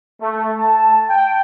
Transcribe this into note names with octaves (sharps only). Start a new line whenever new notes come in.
A3
A5
G5